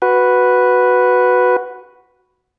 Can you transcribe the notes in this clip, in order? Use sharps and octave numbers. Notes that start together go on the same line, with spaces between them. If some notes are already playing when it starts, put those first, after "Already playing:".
F#4 B4